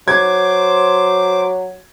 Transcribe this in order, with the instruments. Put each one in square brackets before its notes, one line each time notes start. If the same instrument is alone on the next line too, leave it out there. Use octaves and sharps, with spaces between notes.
[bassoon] F#3 [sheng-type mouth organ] C5 D6 [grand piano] G#6